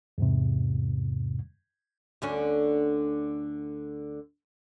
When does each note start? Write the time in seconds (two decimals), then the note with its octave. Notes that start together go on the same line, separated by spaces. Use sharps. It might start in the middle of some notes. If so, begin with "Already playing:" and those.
0.18 E2 G#2 C3
2.22 D2 D3 C#4